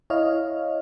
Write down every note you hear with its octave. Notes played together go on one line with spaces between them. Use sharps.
E4 C#5 D#5 F5 F6